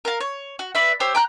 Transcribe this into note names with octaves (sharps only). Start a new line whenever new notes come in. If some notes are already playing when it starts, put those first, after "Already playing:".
A#4 F5
C#5
F#4
B4 D5 E5
G4 C5 C#5 E6
G5 A#5 F#6